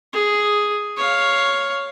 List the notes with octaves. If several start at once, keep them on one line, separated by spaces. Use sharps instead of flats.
G#4
C#5 F5